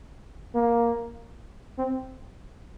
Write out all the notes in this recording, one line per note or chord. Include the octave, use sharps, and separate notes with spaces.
A#3
C4